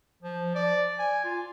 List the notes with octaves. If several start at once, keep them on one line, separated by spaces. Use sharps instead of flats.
F3
D5
G#5
F4